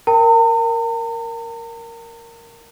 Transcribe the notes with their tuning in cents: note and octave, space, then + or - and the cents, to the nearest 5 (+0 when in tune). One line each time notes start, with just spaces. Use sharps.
A#4 +0 G5 +0 A#5 -45